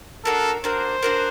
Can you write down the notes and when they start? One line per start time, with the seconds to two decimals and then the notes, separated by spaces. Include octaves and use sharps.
0.25 D4 F#4 A4 A#4
0.64 D4 F#4 A#4 C5
1.03 D4 F#4 A#4